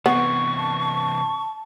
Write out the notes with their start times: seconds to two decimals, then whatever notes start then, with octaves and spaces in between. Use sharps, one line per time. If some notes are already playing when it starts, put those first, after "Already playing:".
0.06 C3 E3 B3 C#6
0.58 A5
0.81 A5